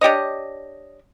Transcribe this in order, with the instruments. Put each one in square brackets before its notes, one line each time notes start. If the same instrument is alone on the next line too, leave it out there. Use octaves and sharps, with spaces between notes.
[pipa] D4 G4 C#5 D#5